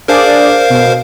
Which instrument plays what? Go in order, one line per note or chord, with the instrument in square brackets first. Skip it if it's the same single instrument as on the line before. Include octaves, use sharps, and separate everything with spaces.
[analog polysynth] D4 G#4 D5 [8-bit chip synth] A#4 C5 F5
[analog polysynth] B2